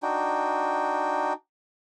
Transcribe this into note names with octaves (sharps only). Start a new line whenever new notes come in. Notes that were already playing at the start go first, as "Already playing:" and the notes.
D4 D#4 F#4 G5